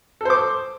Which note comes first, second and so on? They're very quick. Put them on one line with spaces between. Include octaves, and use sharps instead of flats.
A4 C5 D6